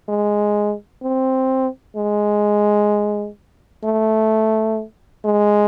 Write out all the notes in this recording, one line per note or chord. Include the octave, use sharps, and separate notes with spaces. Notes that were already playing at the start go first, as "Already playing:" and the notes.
G#3
C4
G#3
A3
G#3